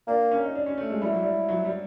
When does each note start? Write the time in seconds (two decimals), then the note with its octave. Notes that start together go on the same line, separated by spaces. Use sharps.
0.08 A#3 D4
0.31 C#4
0.45 D#4
0.55 D4
0.66 C#4
0.78 A3
0.90 G#3
1.02 G3 E4
1.12 F#3
1.23 G3
1.49 F#3
1.65 G3